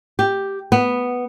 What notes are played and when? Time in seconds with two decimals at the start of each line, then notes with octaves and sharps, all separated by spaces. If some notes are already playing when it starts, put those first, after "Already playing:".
0.19 G4
0.72 B3